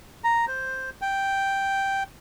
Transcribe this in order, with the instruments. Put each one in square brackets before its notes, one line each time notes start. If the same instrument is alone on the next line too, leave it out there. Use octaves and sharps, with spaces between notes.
[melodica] A#5
C5
G5